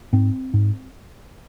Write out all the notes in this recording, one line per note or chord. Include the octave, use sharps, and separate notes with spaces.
G#2 C4
G#2